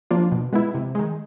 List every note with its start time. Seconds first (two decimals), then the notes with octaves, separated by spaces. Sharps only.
0.11 F3 A#3 D4 F4
0.32 B2
0.53 G#3 B3 E4
0.74 C3
0.95 D#3 G#3